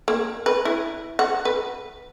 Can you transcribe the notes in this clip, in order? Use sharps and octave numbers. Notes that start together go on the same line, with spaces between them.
A#3
B4
E4
F#5
B4